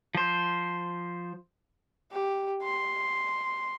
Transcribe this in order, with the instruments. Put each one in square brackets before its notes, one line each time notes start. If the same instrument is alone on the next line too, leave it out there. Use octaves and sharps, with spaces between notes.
[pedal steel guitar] F3 C5
[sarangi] G4
C6